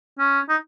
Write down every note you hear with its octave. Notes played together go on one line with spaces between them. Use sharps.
C#4
D#4